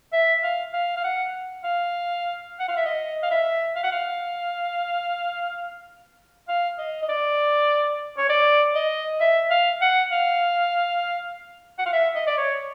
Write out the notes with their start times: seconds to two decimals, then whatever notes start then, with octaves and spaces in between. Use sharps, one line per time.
0.13 E5
0.43 F5
0.73 F5
0.96 F5
1.04 F#5
1.64 F5
2.59 F#5
2.68 F5
2.77 E5
2.85 D#5
3.23 F5
3.31 E5
3.75 F5
3.84 F#5
3.92 F5
6.48 F5
6.78 D#5
7.02 D#5
7.09 D5
8.18 C#5
8.30 D5
8.75 D#5
9.20 E5
9.50 F5
9.82 F#5
10.11 F5
11.78 F#5
11.86 F5
11.93 E5
12.15 D#5
12.27 D5
12.38 C#5